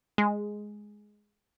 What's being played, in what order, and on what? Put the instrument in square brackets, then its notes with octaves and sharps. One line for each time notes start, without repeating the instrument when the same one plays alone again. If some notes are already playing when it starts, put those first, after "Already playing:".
[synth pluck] G#3